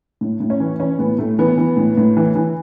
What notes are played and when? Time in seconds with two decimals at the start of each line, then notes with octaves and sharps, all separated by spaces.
0.21 A2
0.40 A2
0.50 C#4
0.60 E3
0.80 E3 C#4
0.99 A2 B3
1.19 A2 A3
1.39 E3 B3
1.58 E3
1.77 A2
1.97 A2
2.17 E3
2.35 E3